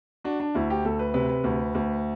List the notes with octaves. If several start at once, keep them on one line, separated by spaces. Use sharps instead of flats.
D4 F#4
D4
D2 E4
G4
D2 A4
B4
C3 B4
B4
D2
D2